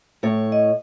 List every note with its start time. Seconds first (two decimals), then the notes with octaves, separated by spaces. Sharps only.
0.23 A2 C#5
0.52 D#5